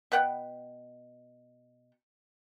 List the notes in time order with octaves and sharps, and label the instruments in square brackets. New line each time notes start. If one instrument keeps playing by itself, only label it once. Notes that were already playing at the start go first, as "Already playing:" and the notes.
[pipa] B2 B4 F#5 G5